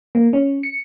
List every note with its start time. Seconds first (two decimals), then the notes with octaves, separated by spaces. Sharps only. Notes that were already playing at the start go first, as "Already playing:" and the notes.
0.15 A#3
0.33 C#4
0.63 C#7